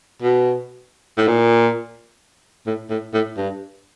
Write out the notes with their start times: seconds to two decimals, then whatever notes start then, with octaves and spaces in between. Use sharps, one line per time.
0.22 B2
1.18 A2
1.27 A#2
2.67 A2
2.90 A2
3.14 A2
3.37 G2